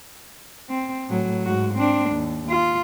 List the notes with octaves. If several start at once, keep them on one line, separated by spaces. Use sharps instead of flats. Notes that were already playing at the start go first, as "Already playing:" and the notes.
C4
A2 F#3
G#2 F#4
C4 D4
D#2
F4